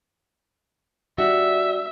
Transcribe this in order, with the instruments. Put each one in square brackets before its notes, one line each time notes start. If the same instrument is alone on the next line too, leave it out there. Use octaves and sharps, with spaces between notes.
[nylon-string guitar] G3 D4 F#4 [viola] E5